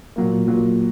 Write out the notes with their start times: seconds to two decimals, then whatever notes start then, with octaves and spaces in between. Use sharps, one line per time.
0.16 A#2 F#3 A#3
0.48 A#2 F#3 A#3